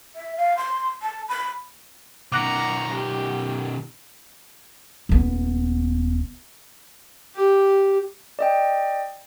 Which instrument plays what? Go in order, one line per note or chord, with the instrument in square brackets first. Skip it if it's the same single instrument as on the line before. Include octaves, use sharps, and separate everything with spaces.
[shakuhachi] E5
F5
C6
A5
B5
[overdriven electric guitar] B2 D#3 [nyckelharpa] F#5 A#5 [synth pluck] D6 F#6 A#6
[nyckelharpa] G4
[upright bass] D#1 B3
[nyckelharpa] G4
[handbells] D5 D#5 G5